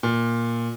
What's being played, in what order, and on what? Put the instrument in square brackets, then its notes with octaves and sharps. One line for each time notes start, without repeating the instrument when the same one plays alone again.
[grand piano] A#2